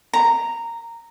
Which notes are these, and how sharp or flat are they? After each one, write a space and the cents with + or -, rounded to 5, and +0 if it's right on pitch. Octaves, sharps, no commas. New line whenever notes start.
A#5 -10